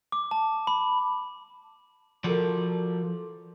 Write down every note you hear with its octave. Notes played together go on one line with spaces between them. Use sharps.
D6
A5
B5
F3 F#4 A4 A#4 D5